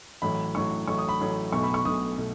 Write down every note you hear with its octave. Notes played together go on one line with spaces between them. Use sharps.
A1 A2 F#3 B5
A1 A2 F#3 C#6
A1 A2 F#3 C#6
D#6
B5
A1 A2 F#3
B1 B2 A3 C#6
B5
C#6
B1 B2 A3 D#6
B2 A3